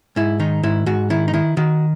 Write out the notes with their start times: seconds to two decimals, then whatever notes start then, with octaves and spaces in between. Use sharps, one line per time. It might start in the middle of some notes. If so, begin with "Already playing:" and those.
0.16 G#2 E4
0.40 D#3 D#4
0.63 G#2 E4
0.86 G#2 F#4
1.10 D#3 E4
1.28 D#4
1.33 D#3 E4
1.57 D#3 F#4